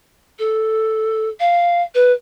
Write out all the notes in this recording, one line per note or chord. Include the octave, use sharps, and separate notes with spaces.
A4
F5
B4